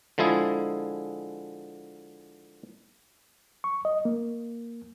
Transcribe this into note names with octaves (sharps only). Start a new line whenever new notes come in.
D3 F3 G#3 E4 G#4
C#6
D#5
A#3